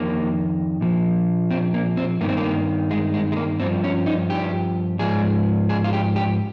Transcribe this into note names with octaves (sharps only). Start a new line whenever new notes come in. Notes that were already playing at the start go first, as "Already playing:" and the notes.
Already playing: F2 D#3 A#3
A#2 F3
C4
A#3
C4
G2 D#3 A#3
C4
A#3
G#3
G#3
G#3
A#3
G2 F3 C4
C#4
D#4
G4
G#2 F3 G#4
G#4
F4
G4
G4